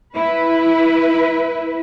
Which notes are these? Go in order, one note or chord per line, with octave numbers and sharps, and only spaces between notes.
E4 B4